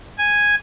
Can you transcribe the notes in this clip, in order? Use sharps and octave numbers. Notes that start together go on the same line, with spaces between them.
G#5